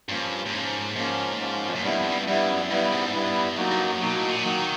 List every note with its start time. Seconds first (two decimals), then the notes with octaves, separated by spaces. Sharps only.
0.09 G2 F3 A#3 C#4 F4
0.45 G2
0.53 G#2 F3 A#3 C#4 F4
0.96 G#2 F3 A#3 C#4 F4
1.40 F3 A#3 C#4 F4
1.69 F2
1.75 F#2
1.83 G2 G3 B3 E4
1.98 F2
2.12 G2
2.27 G2 G3 B3 E4
2.49 F#2
2.70 G2 G3 B3 E4
2.92 G#2
3.14 G2 G3 B3 E4
3.57 F#2 F#3 A#3 D#4 F#4
3.71 G2
3.84 F#2
4.00 B2 F#3 A#3 D#4 F#4
4.16 A2
4.29 A#2
4.44 D#3 F#3 A#3 D#4 F#4